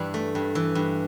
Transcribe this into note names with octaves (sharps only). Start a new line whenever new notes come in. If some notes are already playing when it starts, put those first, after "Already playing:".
Already playing: G2 E3 D4 E4
A3
G2
E3
G2